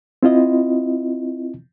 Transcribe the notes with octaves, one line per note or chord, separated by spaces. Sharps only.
C4 E4 F4 D#5